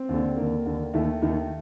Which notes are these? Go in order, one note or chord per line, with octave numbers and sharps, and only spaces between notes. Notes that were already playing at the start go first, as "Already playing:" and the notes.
Already playing: C4
D#2 D3
D#2 D3 A#3
D#2 D3
D#2 D#3 A3
D#2 D#3